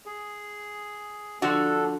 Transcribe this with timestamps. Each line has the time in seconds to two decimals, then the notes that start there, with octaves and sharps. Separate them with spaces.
0.06 G#4
1.42 D3 F3 D4 F#4 A4